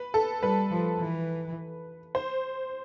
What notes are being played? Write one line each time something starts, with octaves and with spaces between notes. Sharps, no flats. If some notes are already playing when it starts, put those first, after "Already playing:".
Already playing: B4
A4
G3 B4
F3
E3
C5